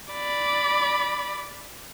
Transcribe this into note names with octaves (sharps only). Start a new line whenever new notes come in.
D5 B5